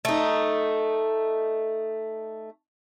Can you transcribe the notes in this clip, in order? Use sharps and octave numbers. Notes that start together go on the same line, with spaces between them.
A3 D#4